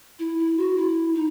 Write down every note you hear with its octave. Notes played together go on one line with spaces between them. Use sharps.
E4
E4
F#4
E4
D#4